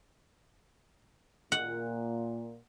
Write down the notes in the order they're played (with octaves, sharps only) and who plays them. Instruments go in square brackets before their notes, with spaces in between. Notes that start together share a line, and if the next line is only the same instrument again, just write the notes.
[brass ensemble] A#2 [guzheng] F#5